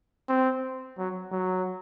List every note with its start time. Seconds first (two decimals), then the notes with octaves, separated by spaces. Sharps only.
0.29 C4
0.98 F#3
1.32 F#3